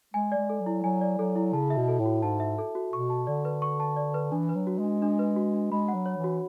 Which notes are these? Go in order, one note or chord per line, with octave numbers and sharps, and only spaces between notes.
G#3 G#5
D5
G#3
A4
F#3
E4
F#3 G#5
D5
F#3 A4
E4
C#3 A5
E5
B2
A4
A2
F#4
G#2 A5
E5
A4
F#4
B2 C#6
A5
D3 D5
B4
C#6
A5
D5
B4
E3 D4
B4
F#3
F#4
G#3
D4
D4
B4
F#4
D4
G#3 B5
F#5
F#3
C#5
E3
F#4